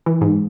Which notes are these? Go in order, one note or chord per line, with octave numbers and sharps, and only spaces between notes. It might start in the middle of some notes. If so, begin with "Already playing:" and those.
E3
G#2